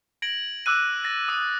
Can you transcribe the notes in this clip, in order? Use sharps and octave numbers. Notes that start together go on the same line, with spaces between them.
G#6 A#6 D7 F#7
D6 E6 F#6 D#7
A6 A#6
D#6 D#7